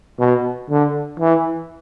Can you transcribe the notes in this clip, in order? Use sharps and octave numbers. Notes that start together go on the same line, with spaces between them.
B2
D3
E3